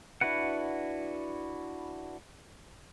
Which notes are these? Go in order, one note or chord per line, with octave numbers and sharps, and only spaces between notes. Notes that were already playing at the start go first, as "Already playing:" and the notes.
D4 E4 F#4 B4 F#5